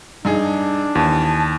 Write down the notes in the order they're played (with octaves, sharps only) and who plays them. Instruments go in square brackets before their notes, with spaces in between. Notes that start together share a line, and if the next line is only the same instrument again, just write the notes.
[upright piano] G2 D#4 G#4 [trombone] D4
[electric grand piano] D#2 [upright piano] E3 [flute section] G#5 A5